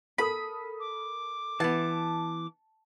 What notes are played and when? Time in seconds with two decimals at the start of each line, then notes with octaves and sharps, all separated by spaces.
0.18 A4 A#4 B5 D#6
0.80 D6
1.60 E3 B3 A5